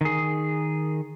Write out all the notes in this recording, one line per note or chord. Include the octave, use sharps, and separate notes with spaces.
D#3 G#4